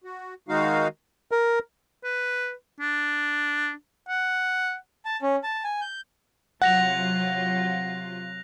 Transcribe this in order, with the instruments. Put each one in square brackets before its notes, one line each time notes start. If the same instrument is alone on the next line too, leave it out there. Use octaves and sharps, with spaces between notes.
[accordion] F#4
D#3 G#3 D#4 F#4 F5
[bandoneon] A#4
[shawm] B4
D4
F#5
[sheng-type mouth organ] A5
C#4
A5
G#5
G6
[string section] C3 F#3 F4 [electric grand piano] F#5 [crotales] F#6 A#6 F7